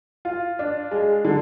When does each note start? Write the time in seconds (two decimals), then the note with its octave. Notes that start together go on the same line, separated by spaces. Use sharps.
0.25 F4
0.59 D4
0.91 G#3
1.25 D3